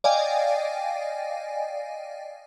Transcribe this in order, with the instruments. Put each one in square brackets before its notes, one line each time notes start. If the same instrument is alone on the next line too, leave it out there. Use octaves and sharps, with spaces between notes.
[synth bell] D5 D#5 F5 G5 G#5